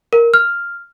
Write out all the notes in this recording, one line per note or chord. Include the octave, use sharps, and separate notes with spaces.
A#4
F6